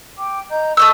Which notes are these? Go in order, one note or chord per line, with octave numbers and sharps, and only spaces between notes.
G5 D6
D#5 A#5 G6
A3 D#5 C#6 E6 G6